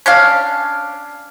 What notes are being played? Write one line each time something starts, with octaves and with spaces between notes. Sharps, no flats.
C#4 D4 F5